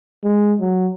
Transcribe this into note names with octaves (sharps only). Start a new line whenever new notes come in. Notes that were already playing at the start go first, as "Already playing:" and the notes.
G#3
F#3